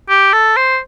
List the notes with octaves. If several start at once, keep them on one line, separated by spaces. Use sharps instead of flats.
G4
A4
C5